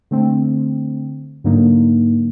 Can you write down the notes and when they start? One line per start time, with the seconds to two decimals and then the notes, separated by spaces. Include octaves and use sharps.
0.11 D3 A3 C4
1.44 G#2 D3 F#3 A#3 D#4